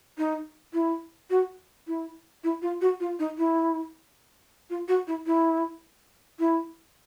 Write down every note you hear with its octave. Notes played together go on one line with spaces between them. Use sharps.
D#4
E4
F#4
E4
E4
F4
F#4
F4
D#4
E4
F4
F#4
E4
E4
E4